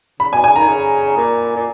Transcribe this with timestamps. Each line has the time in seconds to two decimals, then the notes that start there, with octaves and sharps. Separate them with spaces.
0.20 C#3 B5
0.32 B2 G#5
0.44 C#3 G#5
0.56 D#3 A#5
0.68 C#3
1.17 A#2
1.56 A#2